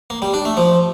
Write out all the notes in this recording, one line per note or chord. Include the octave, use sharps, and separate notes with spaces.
A#3
G3
D4
A3
F3